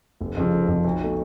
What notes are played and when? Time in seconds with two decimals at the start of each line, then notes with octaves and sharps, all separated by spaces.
0.21 F1
0.37 F2 C#3 F3
0.53 F1
0.68 F2 C#3 F3
0.84 B1
1.01 B2 A3